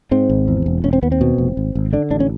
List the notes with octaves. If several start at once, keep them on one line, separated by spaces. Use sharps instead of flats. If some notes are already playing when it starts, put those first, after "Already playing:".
G#2 C4
G#1
E2
E1
E1 C#4
C4
D#2 B3
C4
B2
F1
G#1
G#1
D3 D4
A1 D4
C#4